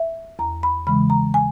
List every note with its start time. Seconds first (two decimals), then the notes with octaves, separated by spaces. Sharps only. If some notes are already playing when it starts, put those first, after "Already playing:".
Already playing: E5
0.39 E2 A#5
0.63 B5
0.87 C#3 E3 G#3 B5
1.10 A#5
1.34 G#5